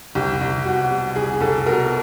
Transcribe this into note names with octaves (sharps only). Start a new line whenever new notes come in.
C2 G4
C2
B2 F#4
G3
C2 G#4
C2 A4
B2 A#4